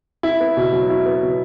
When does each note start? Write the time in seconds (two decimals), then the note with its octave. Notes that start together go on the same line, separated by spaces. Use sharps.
0.23 E4
0.40 B3
0.57 B2
0.73 F#3
0.90 E4
1.06 B3
1.22 B2